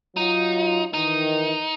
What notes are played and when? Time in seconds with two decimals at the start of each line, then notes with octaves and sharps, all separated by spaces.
0.17 F#3 D#4 F4
0.94 D#3 E3 D#4